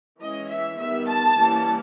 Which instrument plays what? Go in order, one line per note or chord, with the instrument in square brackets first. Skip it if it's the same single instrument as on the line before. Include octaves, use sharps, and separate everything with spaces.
[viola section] E3 G#3 C#4 D#5
E5
D#3 G3 B3 E5
A5
E3 G3 A#3 C#4